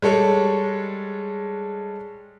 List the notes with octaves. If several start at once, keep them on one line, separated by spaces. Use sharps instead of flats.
G3 G#3 A4 C#5